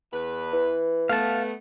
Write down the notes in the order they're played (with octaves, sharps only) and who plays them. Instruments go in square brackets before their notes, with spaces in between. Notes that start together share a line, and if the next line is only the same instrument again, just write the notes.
[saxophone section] E2 B4
[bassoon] E3
[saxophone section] A3 B3 [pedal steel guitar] F5 A5